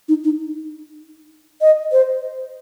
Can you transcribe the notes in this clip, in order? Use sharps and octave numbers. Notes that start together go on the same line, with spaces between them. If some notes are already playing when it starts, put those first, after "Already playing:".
D#4
D#4
D#5
C5